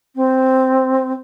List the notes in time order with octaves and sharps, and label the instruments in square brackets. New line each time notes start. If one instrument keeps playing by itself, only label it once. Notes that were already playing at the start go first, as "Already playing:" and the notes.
[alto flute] C4